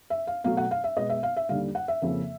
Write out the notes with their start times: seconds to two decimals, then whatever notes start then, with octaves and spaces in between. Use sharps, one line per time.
0.10 E5
0.27 F5
0.44 B2 F#3 A3 F5
0.57 F#5
0.71 F5
0.84 E5
0.97 B2 G#3 B3 D#5
1.09 E5
1.23 F5
1.37 E5
1.49 D#2 D3 G3 F5
1.75 F#5
1.88 E5
2.02 F2 C#3 F3 A#3